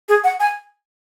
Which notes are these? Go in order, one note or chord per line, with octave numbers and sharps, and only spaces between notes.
G#4
F#5
G#5